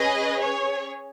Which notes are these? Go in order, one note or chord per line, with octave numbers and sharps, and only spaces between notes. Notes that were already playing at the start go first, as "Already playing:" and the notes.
Already playing: C#4 G#4 B4 D#5
C#5